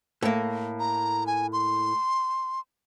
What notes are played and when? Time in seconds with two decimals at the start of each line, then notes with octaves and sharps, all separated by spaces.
0.22 A2 A#3
0.79 A#5
1.27 G#5
1.53 C6